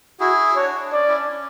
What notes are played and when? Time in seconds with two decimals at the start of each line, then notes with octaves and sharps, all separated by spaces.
0.20 E4 F#4 G#4
0.56 D4 F#4 C#5
0.75 D4
0.92 C#4 D5
1.08 E4
1.19 D4
1.29 C#4